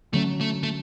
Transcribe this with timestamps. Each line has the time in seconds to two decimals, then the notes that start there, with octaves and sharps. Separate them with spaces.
0.13 D3 F#3 A3 C#4
0.41 A3
0.63 A3